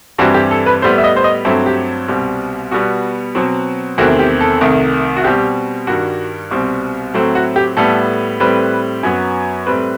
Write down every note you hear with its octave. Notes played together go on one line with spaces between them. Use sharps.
G2 E3 G3 C4 F#4
G4
A4
B4
A2 G3 B3 C5
E5
D#5
C5
D#5
G2 F#3 A3 C4 E5
G4
C2 B2 G3 C4
B2 G3 B3 F#4
B2 F#3 C4
E2 C3 D#3 A3 C4 F#4
G4
A4
C2 C3 D#3 A3
F#4
B2 G3 C4 G4
G2 D#3 G3 F#4
C2 B2 G3 C4
A2 F#3 A3 C4
F#4
G4
A2 G3 B3 A4
A2 G3 C4 B4
F#2 F#3 B3
A2 G3 C4 B4